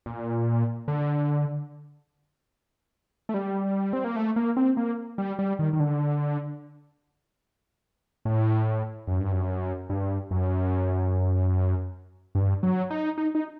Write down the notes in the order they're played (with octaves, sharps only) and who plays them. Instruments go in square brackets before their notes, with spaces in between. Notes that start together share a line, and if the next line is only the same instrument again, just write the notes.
[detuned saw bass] A#2
D3
A3
G3
C4
A#3
A3
A#3
C4
A#3
G3
G3
D#3
D#3
D3
A2
F#2
G2
F#2
G2
F#2
G2
F#3
D#4
D#4
D#4